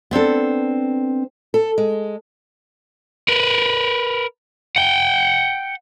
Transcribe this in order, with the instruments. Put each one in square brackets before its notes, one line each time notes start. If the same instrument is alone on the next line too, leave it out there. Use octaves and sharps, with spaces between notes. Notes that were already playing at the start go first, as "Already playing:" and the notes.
[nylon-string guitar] B3 C4 D4 A4
[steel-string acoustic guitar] A4
G#3
[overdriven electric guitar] A#4 B4
F#5 G5